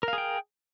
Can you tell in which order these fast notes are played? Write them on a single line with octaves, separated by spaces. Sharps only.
A#4 F5 G#4 G5